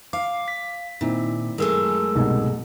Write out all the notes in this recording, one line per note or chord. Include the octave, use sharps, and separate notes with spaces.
F5 D6
B6
A#2 D#3 C4 E4
F#2 G#3 A3 A4 A#4 E6
C2 G#2 B2